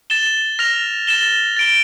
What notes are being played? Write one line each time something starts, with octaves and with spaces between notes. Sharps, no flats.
A6 E7 G7
F6 A#6 F7
A6 E7 G7
A6 D7 G7